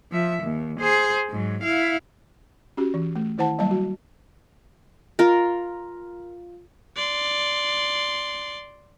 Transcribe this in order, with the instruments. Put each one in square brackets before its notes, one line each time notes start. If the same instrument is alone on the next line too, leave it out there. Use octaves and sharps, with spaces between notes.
[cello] F3 E5
D#2
G#4 C5
G#2 F#3
E4 F5
[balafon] C#4 F#4 G4
E3
A3
D#3 E4 C5 F#5 A5
F#3 G3 A#3 D#5 A5
F#4
[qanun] F4 A#4
[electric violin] D5 C6